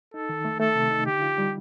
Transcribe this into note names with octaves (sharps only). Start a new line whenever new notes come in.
D#4 A4
D#3
A3
A3 A4
C3
D#4
D3 G4
F4
G3